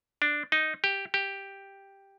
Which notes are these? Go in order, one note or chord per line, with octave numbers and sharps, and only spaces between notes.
D4
D#4
G4
G4